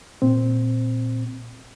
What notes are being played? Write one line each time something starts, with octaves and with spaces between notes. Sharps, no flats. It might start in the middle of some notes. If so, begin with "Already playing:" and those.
A#2 C4